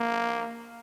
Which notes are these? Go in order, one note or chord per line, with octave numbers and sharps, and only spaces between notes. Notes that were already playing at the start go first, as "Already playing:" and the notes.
Already playing: A#3